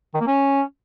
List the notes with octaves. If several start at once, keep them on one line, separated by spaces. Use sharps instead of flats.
D#3
A#3
C#4